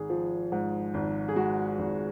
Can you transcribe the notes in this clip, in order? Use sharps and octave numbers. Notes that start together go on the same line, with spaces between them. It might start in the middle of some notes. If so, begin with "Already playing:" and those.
Already playing: G#1 G#4
F3
G#2
G#1
G#4
G#3 F#4
G#1